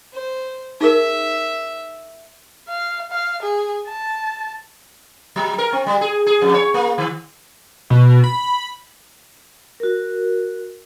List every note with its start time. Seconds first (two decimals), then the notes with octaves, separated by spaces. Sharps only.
0.13 C5
0.81 D#4 G#4 A#4 E5
2.69 F5
3.12 F5
3.43 G#4
3.88 A5
5.36 F#3
5.58 A#4
5.73 C4
5.86 G3
6.01 G#4
6.27 G#4
6.41 F2
6.54 C#5
6.74 A#3
6.98 D#3
7.90 B2
8.24 B5
9.80 F#4 A#4